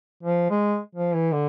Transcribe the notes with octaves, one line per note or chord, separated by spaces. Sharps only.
F3
G#3
F3
E3
D3